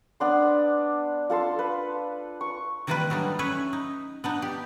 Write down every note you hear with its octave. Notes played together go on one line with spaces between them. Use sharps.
B3 D4 C6
F4 A4 A5 C6
B4
C#6
D#3 E3 G3 A#3 F4 B4
F#3 G3 A3 D4 D#4
C#4 B4 C#5 E5
D#4
B3 D4 D#4
G4